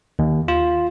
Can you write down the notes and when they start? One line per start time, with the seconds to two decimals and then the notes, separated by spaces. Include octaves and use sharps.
0.19 D#2
0.48 F4